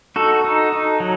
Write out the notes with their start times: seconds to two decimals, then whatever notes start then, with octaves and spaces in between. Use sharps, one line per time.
0.16 D#4 F#4 A4
0.44 D#4
0.72 D#4
1.00 F#3